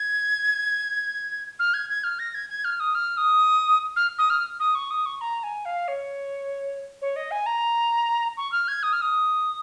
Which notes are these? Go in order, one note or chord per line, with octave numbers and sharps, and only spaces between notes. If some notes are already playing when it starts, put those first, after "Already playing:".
Already playing: G#6
F6
G#6
G#6
F6
A#6
G#6
G#6
F6
D#6
F6
D#6
F6
D#6
F6
D#6
C#6
D#6
C#6
A#5
G#5
F5
C#5
C#5
D#5
G#5
A#5
C#6
F6
G#6
D#6
F6
D#6